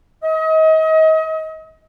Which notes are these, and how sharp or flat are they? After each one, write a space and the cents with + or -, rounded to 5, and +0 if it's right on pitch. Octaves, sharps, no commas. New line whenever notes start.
D#5 +35